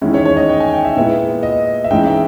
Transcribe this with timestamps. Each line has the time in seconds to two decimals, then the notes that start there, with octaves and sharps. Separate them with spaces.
0.01 E2 D#3 G#3 C#4 E4
0.14 C#5
0.25 C#5
0.37 D#5
0.49 G5
0.60 G#5
0.73 G5
0.85 E5
0.96 A#2 G#3 B3 E4
1.43 D#5
1.84 E5
1.91 G#2 E3 G#3 C#4 G5
2.06 E5